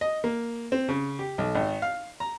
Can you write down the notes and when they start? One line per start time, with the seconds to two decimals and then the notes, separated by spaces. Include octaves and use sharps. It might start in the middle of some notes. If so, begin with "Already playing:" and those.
0.01 D#5
0.24 A#3
0.72 C4
0.89 C#3
1.19 G4
1.38 B1
1.55 G#1
1.82 F5
2.20 A#5